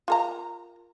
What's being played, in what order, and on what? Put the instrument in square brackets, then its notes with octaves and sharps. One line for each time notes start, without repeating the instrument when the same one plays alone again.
[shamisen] F4 A#4 A#5